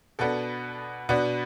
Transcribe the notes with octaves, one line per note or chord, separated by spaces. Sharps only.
B2 B3 D4 A4
B2 B3 D4